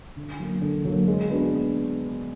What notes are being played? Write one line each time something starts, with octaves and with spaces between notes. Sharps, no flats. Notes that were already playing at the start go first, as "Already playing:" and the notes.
D3
F#3 A#3
D3
F#3 A#3
G#3
B3 D4 F#4